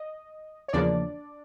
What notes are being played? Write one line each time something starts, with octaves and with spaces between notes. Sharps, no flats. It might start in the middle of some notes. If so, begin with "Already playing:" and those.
Already playing: D#5
C#5
E2 C#3 F3 A#3 D4 D5